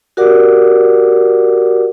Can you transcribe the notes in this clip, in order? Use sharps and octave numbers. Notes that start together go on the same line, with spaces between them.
F#4 G4 A#4 D5 F#5 D6